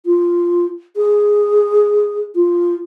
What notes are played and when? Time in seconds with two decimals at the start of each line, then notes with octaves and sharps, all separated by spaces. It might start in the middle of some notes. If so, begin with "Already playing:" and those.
0.06 F4
0.96 G#4
2.35 F4